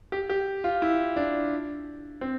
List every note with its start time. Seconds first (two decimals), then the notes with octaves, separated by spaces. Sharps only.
0.12 G4
0.29 G4
0.64 F4
0.82 E4
1.16 D4
2.21 C4